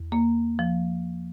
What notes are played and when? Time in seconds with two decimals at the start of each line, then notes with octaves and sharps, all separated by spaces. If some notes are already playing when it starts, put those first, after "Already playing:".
Already playing: E2
0.12 A#3
0.59 F3